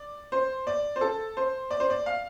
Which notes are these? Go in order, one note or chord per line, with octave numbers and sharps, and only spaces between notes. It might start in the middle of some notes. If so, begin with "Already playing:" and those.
Already playing: D5
C5
D5
C5
A4
C5
D5
C5
D5
F5